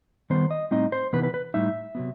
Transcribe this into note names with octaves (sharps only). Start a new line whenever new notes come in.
D#3 G3 B3 C5
D#5
A2 G3 C4 D#4 D#5
C5
C3 E3 B3 D#4 B4
B4
B4
A2 G3 D#4 E5
C3 F#3 B3